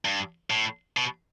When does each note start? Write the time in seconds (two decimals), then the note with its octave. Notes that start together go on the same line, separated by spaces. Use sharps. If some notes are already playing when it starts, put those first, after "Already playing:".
0.05 G2
0.50 A2
0.97 B2